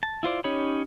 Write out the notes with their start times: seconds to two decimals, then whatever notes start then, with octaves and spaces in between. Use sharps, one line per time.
0.03 A5
0.23 E4 F4 C5 D5
0.44 C#4 D#4 G4 C#5 B5